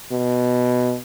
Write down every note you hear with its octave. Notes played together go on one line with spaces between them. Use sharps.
B2